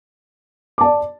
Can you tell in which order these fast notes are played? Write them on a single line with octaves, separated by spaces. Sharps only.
D6 A5 D5